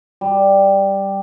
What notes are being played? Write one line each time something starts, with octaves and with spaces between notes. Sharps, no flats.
G3